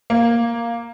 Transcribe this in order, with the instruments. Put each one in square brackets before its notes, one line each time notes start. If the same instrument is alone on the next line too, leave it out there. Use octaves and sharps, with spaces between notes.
[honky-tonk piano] A#3